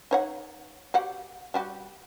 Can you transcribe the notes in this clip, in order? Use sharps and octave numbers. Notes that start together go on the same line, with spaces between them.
D#4 C#5 F#5
F#4 G4 F#5
G3 F#4 G4